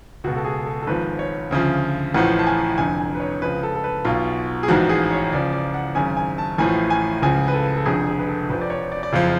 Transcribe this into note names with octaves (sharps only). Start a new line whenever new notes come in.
C#2 B2 F#4
A4
G#4
A4
A4
G#1 G#2 F3 B4
C#5
D2 C#3 F3
A1 A2 F3 F#5
A5
G#5
F1 F2 D3 G#5
G#5
B4
C#5
C#2 C#3 F3 B4
A4
A4
B4
B1 B2 F4
G#4
A1 G#2 F3 F#4
G#4
C#5
C#2 C#3 F3 D5
D5
F#5
G#1 F#2 C#3 G#5
G#5
A5
A1 A2 F3 G#5
G#5
C#2 C#3 F3 G#5
B4
A4
A4
F1 F2 D3 G#4
G#4
B4
A4
F1 F2 F3 B4
D5
C#5
D5
D5
F#1 F2 F3 F5